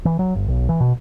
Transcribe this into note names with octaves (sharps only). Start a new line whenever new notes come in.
E3
F#3
G1
B1
E3
B2